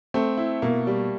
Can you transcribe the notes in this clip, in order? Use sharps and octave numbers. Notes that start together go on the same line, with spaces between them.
A3 C4
E4
B2 A#3
G3